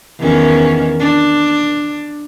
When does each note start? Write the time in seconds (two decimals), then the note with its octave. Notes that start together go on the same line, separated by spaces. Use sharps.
0.20 E2 D#3 C#4
1.00 D4